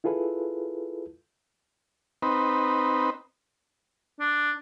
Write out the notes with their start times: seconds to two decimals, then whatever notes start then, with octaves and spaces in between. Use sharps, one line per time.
0.04 E4 F4 G#4 A4 B4
2.22 C4 D#4 B4
4.20 D4